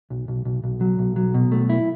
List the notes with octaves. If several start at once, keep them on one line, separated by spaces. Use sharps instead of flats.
B1
B1
B1
B1
F#3
B1
F#3
B2
A3
E4